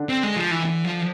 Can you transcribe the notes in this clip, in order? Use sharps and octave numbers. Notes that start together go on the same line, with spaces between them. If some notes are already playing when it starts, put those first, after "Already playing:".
Already playing: D3 D4
C4
G#3
F3
E3
E3
F3